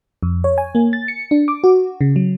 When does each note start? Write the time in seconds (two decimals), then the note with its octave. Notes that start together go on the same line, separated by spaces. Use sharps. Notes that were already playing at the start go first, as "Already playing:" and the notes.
0.23 F2
0.44 C#5
0.58 G#5
0.75 A#3
0.93 A6
1.08 C#7
1.31 D4
1.48 D6
1.64 F#4
2.01 C#3
2.16 F#3